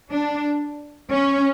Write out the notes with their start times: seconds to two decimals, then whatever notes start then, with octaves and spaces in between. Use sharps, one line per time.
0.11 D4
1.11 C#4